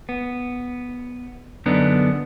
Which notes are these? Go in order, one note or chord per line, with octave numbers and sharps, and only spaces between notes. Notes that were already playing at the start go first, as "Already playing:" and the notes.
B3
F#2 D3 B3 D4 D#4